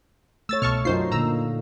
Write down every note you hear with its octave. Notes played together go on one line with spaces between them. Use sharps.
A3 C#5 E6 A6
C2 B2 A5 C#6 F6
F#2 D#4 F4 C5 C7
A#2 D3 A#3 A#5 E6